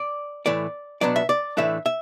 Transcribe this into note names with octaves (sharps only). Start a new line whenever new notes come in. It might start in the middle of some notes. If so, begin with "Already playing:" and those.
Already playing: D5
A2 E3 A3 D5
B2 F#3 B3 D4 D5
E5
D5
A2 E3 A3 D4 E5
E5